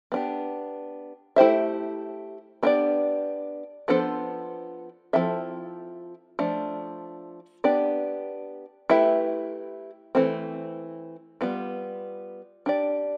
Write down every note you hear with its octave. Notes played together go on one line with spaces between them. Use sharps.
B3 D4 G4
A3 E4 G4 C5 E5
B3 D4 G4 D5
F3 B3 D4 A4 C5
F3 C4 E4 A4 E5
F3 A3 D4
B3 D4 G4 D5
A3 E4 G4 B4 E5
E3 A3 C4
G3 B3 F4
D4 G4 D5